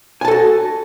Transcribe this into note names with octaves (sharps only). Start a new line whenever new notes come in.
F#4 A4 G#5 A5